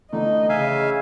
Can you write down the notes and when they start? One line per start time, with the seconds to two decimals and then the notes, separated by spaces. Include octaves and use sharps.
0.12 D3 E3 A3 D#4 D#5
0.49 C#3 E5 F5 G#5